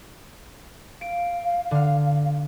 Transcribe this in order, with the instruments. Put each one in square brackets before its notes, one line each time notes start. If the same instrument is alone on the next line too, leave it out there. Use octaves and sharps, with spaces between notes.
[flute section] F5 [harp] D7
[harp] D3 F6